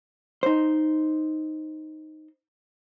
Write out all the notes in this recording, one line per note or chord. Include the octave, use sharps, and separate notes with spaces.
D#4 C5